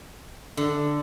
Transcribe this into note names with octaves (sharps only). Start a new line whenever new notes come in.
D3